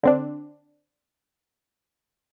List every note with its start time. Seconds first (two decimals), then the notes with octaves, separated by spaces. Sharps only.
0.03 D3 C4 D4